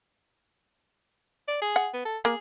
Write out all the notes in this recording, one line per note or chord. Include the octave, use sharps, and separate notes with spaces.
D5
G#4
F#5
B3
A4
A#3 G#4